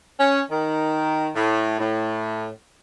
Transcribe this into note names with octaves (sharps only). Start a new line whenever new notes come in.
C#4
D#3
A2
A2